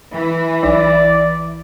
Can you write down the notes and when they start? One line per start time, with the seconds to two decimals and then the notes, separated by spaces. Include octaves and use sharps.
0.13 E3
0.63 B1 D5